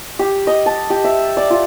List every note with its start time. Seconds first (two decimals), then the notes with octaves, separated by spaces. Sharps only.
0.19 G4
0.47 D#5
0.66 A5
0.90 G4
1.04 E5
1.37 D5
1.50 F4